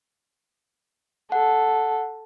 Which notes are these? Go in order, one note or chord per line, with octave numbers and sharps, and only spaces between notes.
A4 F#5